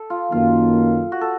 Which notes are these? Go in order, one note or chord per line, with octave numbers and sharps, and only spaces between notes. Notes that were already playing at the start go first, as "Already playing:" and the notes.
Already playing: A4
F4
F#2 D#3 F#3 A#3 F4
F#4
A4